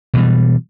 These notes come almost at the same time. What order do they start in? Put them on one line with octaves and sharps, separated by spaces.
B2 E3 G3